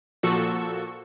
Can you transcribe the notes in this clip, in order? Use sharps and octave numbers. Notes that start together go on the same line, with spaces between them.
A#2 F3 F#4 A4 C#6 E6